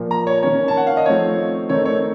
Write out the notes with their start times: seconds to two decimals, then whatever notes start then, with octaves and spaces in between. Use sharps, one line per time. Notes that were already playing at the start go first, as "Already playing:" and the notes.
Already playing: A#2 F3 A#3
0.11 A#5
0.27 C#5
0.42 D#3 A#3 C#4 C#5
0.68 A5
0.77 F#5
0.87 F5
0.97 D#5
1.06 F3 A3 C4 D#4 C#5
1.69 D#3 A3 C4 D#4 C#5
1.85 C#5